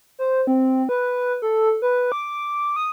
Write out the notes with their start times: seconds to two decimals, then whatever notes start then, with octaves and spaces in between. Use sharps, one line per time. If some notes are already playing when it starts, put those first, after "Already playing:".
0.19 C5
0.47 C4
0.89 B4
1.42 A4
1.82 B4
2.12 D6
2.76 D#6